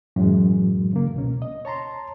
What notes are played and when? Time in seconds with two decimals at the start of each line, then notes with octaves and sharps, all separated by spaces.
0.16 F#2 A2 E3 F#3 G#3
0.93 C#3 A#3
1.14 C#2 B2 C#4
1.42 D#5
1.65 C#5 A5 A#5 C6